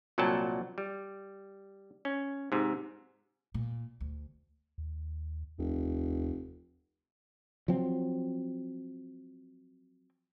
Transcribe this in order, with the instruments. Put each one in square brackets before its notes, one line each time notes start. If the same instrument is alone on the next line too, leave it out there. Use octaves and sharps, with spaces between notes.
[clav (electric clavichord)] C2 A#2 F#3 F#5 G5 A5
G3
C#4
G#2 C3
[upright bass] A#2
D2
[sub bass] D#2
[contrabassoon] F1 [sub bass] D#2
[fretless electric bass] F3 F#3 C4